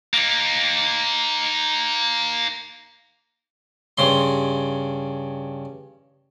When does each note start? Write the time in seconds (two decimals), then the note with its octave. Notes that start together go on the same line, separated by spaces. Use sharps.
0.14 A#3 D#4
3.98 G2 C#3 C6